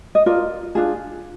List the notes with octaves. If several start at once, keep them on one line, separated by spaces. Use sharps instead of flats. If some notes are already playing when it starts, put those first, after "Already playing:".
D#5
F4 A#4 D5
D4 F4 G#4